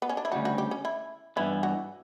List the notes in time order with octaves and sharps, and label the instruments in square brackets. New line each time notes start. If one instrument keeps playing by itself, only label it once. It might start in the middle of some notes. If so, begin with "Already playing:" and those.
[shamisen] B3
C#4
D4
E4
[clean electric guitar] D2 C#3 G3 [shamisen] F#4
[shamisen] F#4
G4
C#4
E4
[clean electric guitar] G2 E3 B3 [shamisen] E4
[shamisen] F#4